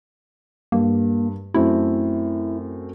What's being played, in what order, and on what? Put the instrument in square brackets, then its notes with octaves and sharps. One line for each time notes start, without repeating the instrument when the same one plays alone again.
[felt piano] G2 [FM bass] A#3
[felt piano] F#2 A3 C4 [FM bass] E4